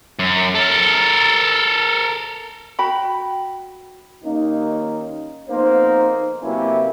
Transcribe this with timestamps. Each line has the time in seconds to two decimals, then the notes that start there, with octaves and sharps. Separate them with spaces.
0.19 F#2
0.55 A4 A#4
2.79 F#4 G5 B5
4.24 D#2 A#3 C#4 D#4
5.50 F2 A#3 B3 D#4 C5
6.43 C3 F#3 A#3 B3 C#4 E4